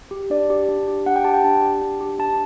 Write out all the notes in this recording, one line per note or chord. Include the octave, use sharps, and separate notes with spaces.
G4
D4 D5
G4
D4
G4
D4 F#5
G5
G4 A5
G5
D4 A5
G4
D4
G4
D4 A5